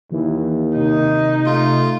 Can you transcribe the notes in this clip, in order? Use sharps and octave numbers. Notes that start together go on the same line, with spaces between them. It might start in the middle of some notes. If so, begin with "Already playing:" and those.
D#2 E3
C3 D#4
A3 F4